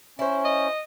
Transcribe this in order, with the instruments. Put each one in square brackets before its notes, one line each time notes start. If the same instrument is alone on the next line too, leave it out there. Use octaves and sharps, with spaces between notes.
[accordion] C#4 [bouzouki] E4 C5
[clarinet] D#5